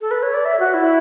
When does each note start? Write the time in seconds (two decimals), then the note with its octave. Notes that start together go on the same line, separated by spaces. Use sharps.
0.01 A4
0.11 B4
0.23 C#5
0.34 D5
0.45 E5
0.60 F#4
0.74 E4